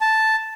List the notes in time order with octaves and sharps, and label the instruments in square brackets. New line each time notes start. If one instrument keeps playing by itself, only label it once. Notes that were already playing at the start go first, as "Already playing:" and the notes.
[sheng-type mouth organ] A5